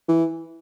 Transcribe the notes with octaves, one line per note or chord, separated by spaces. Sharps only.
E3